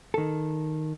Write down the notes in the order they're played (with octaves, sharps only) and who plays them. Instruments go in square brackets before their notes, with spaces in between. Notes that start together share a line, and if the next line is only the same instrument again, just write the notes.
[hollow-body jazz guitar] D#3 A4